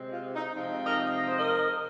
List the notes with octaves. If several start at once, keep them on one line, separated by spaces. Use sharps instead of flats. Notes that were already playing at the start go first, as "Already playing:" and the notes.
Already playing: C3 G#3 C4
F4
D#4
C3 F3 G#3 C4 D#4
A#4 D#5
D#5
C5
A#4 D#5